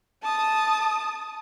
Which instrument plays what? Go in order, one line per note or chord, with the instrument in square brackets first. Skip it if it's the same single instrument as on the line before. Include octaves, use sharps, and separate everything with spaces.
[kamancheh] A5 D#6